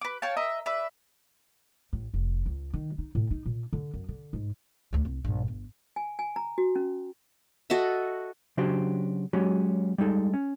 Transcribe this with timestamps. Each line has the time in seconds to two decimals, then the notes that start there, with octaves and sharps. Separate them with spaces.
0.01 B4 D6
0.22 C#5 F5 G5 A5
0.37 A#4 D#5 E5
0.66 B4 D5 E5
1.93 A1
2.14 F1
2.46 C#2
2.73 D#3
2.98 D#4
3.15 A2
3.31 D#4
3.46 A#2
3.73 D3
3.94 F#2
4.08 D3
4.33 G#2
4.93 D2 D4
5.05 C2
5.24 A#1 G2
5.48 G1
5.96 G#5
6.19 G#5
6.36 A#5
6.58 F#4
6.76 C#4
7.70 F#4 A4 D#5 E5
8.57 C#3 F#3 D4 F#4 G4 C5
9.33 F#3 G#3 C#4 F#4 G4
9.98 G3 G#3 D#4 A4
10.34 C#4